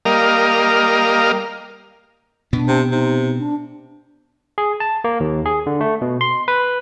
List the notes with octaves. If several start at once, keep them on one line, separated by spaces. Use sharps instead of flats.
G3 A#3 A#4 D#5 F5
B2 B3 D4
C3
C3 D#4
D4
G#4
A5
A#3
D#2
G#4
D3
A3
B2
C6
B4